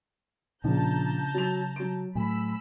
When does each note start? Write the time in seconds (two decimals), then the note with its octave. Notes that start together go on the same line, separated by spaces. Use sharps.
0.64 A#1 C#3 A5 A#5 G6
1.34 F#3 F7
1.76 F#3 D7
2.15 A2 F#3 G#5 B5 E6